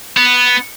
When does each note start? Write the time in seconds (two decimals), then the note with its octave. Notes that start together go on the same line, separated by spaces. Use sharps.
0.17 B3